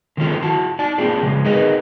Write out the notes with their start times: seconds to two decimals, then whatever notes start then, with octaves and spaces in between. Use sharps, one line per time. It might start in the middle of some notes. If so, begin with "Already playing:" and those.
0.17 D3 D#3 A3 C#4 F4 A4
0.42 E4 F#4 A5
0.79 D#4 D5 A5
0.98 A#3 C4 D4 F4 G4 G#4
1.23 C#3 F3 G#3
1.44 D#4 G#4 A#4 B4 D#5